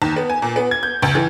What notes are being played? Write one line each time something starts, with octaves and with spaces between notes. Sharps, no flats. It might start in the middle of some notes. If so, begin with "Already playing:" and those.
D#2
B3
G#5
A#2
B3
G#6
G6
C#2
E3